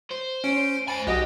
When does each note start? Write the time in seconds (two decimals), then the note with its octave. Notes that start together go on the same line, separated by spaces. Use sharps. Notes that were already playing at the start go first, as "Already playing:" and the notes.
0.11 C5
0.44 C#4 C#5 D7
0.88 C5 G#5 B5 A6
1.07 B1 F#4 G4 D#5 A#6